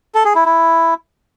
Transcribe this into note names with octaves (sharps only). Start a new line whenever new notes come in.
A4
G#4
E4
E4